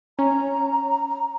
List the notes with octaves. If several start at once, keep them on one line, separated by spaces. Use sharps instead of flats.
C#4 A#5